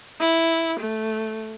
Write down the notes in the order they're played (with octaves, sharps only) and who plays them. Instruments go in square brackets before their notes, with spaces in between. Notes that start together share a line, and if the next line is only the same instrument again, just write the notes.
[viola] E4
A3